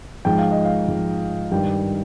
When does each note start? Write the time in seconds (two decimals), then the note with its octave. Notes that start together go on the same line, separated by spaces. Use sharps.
0.25 G#2 F3 G5
0.38 F5
0.51 D#5
0.65 F5
0.88 G#2 F3
1.52 G2 D#3 G5